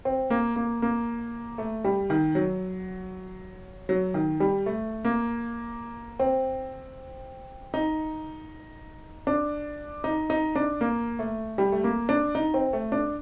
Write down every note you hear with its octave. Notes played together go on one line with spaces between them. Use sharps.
C4
A#3
A#3
A#3
A3
G3
D#3
F#3
F#3
D#3
G3
A3
A#3
C4
D#4
D4
D#4
D#4
D4
A#3
A3
G3
A3
A#3
D4
D#4
C4
A3
D4